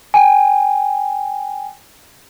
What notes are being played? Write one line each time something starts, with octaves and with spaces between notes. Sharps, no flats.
G5 G#5